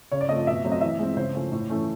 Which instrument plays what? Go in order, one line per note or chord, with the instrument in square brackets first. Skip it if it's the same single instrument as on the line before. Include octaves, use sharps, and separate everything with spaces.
[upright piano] C#3 C#5
D5
F3 A3 C4 D#5
B2 E5
F#3 A3 C4
D#5
E3 E5
G#3 C4
C#3 C5
F3 A3 C#4
A2
E3 A3 C#4